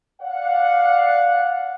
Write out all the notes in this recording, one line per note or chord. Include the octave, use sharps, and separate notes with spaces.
D5 F5 F#5